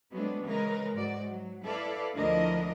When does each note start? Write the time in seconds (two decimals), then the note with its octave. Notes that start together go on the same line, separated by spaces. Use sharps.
0.11 F#3 G#3 A3 B3 C4 D4
0.42 C#3 E3 G#3 A#4 B4
0.93 G#2 F#4 D5
1.30 F#3
1.64 E4 A4 B4 D5 F5
2.13 D2 F3 D4 E4 A#4 D#5